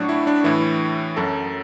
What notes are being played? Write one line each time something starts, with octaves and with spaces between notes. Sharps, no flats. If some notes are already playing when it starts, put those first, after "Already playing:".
Already playing: A2 F#3 D4 F#4
E4
D4
A2 E3 E4
F#2 F#3 A4